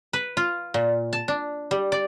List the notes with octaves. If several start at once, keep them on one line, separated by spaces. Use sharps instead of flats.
B4
F4
A#2
A5
D4
G3
D5